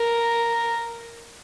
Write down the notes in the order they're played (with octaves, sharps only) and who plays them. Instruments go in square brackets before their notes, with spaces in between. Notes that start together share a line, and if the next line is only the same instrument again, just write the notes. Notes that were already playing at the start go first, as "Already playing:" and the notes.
Already playing: [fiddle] A#4